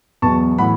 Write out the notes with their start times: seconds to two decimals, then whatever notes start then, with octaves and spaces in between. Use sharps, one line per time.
0.22 E2 B2 F#3 B3 A5 C#6
0.58 A2 E3 F#5 B5